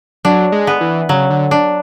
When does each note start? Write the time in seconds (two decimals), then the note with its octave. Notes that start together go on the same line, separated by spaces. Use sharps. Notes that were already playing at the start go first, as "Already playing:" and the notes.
0.25 F#3 D4
0.52 G#3
0.67 B3
0.81 E3
1.09 C#3 F#3
1.30 D3
1.51 D4